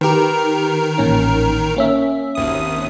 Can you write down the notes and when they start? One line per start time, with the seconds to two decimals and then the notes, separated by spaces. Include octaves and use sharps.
0.01 D#3 G4 A#4 B4
0.98 A1 A#2 C#4
1.76 A#3 C#4 E5
2.35 G#1 D#2 D#6